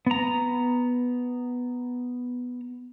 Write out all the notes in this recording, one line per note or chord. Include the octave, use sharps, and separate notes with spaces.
B3 A#5